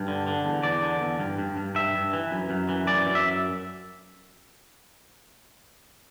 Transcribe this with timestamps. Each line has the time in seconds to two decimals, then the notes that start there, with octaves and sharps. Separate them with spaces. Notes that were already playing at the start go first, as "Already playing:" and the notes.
Already playing: G2
0.08 D3
0.27 D3
0.46 E2
0.63 E2 D5
0.83 D3
1.02 E2
1.19 G2
1.38 G2
1.57 G2
1.75 G2 E5
1.95 G2
2.13 E3
2.31 F#2
2.50 F#2
2.69 E3
2.87 F#2 D5
3.06 F#2
3.15 E5